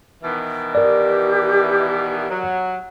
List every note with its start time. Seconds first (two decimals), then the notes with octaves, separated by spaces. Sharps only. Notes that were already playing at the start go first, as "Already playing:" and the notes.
0.23 B2 D#3 E3
0.75 G4 A#4 D5
2.30 F#3